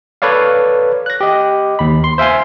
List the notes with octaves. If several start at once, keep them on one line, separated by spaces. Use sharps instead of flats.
A4 B4 C#5 D5 F5
F#6 A#6
G4 D#5
D#2 B5
C6
C5 E5 F5 G#5 C6